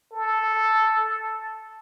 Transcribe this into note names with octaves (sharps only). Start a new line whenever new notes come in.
A4